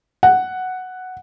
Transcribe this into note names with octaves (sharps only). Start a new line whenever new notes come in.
F#5